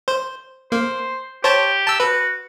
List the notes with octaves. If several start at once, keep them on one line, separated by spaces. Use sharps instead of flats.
C5
A#3 C5
G4 C5 C#5 A5
A5 E6
F#4 B4